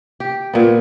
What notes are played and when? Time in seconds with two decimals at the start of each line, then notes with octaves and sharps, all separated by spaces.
0.20 G4
0.53 A#2 B3